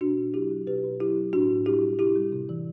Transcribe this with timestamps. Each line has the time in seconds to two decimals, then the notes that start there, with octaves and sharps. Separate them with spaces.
0.01 B2 D4 F#4
0.18 B2
0.34 F#3 E4 G4
0.51 F#3
0.67 B2 G4 B4
0.84 B2
1.00 F#3 E4 G4
1.16 F#3
1.33 A2 D4 F#4
1.50 A2
1.66 G3 E4 G4
1.82 G3
1.99 C3 E4 G4
2.16 G3
2.32 C3
2.49 E3